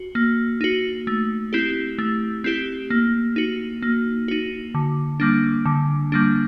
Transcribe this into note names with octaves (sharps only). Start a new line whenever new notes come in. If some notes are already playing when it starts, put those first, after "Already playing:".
Already playing: F#4
A#3
D#4 F#4
A3
C4 E4 G4
A3
C4 E4 G4
A#3
D#4 F#4
A#3
D#4 F#4
D3
G3 A#3 D4
D3
G3 A#3 D4